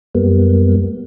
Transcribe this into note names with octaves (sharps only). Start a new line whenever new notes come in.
F#2 G3 A#3 B3